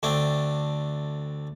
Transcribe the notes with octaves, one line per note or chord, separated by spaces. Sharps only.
D2 A3 C4 D4 G5